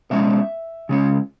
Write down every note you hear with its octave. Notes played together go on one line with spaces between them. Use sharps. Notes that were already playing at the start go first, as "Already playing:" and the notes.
B2 G#3 C#4 E5
C#3 G#3 C#4